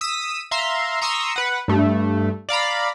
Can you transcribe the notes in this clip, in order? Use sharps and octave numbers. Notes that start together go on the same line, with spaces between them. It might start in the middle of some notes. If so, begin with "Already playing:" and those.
D#6 E6 B6 D#7
E5 F5 A#5 C6
A#5 C6 C#6 D#6 E6
B4 F#5
G2 A3
D5 F5 A#5 B5